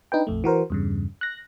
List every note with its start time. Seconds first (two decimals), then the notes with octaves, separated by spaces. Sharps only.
0.12 D4 D#4 B4 G5
0.27 A#1 F2 A3
0.44 E3 F#4 A#4 C5
0.70 E2 G2 C#3
1.21 F#6 A#6